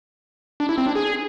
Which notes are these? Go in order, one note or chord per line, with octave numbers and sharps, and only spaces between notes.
D4
E4
C4
D4
G#4